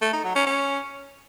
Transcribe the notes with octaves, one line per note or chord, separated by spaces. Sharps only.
A3
D#4
F#3
C#4
C#4